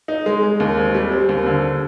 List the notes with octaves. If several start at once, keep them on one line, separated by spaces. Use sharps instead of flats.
D#4
G#3
G#3
D#2
C4
G3
C4
D#2
D3